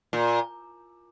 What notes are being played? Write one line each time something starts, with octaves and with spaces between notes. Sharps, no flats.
A#2